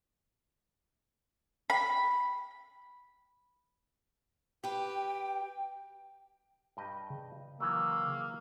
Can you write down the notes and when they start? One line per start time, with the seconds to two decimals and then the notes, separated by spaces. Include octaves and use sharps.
1.70 B5
4.64 G4 B4 G5
6.77 G2 G4 D#5
7.10 C#3
7.60 D#3 E3 F#3 A#3 E6